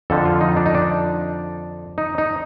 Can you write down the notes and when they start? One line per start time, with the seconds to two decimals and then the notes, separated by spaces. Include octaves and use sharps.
0.10 F2 D3 F3 A4
0.25 F4
0.41 D#4
0.57 D4
0.66 D#4
0.75 D4
1.98 D#4
2.18 D#4